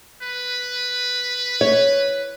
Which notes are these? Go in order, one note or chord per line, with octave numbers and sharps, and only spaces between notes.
B4
C#5